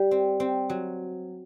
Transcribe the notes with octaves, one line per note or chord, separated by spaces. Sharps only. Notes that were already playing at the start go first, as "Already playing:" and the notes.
Already playing: G3
C4
C4
F#3